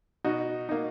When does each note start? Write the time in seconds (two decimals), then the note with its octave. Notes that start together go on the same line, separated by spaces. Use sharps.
0.24 B2 D#4 F#4
0.69 A#3 D#4